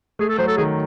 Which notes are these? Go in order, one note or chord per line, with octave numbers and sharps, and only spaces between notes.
A3 G#4
A4
F#3 C5
A4
D#3 G#4